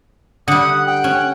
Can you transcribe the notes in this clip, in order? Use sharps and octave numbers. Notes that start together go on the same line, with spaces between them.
D3 G3 F#5 D#6
G5
C#4